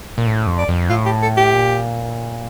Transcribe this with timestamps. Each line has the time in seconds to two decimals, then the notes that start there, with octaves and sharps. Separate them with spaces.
0.18 A#2
0.26 A2
0.47 F2
0.58 D5
0.68 F2
0.90 A2 F4
1.05 G4
1.22 A4
1.37 G4
1.54 A#2